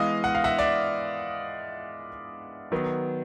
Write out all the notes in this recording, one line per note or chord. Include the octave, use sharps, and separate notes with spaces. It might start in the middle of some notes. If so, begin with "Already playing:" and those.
Already playing: E3 G#3 B3 D#5 F5
F#5
F5
E5 F#5
D5 E5
D#3 F#3 B3